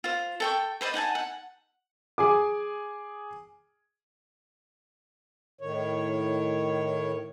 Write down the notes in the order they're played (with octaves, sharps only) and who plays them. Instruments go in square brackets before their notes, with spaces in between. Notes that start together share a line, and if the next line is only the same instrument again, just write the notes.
[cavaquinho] F4 C5
A4 G5 C#6
B4 C5 D5 D#5
D#4 F#5 G#5 A5
F#5
[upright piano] G#4 G#5 D6
[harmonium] A2 D#3 C#5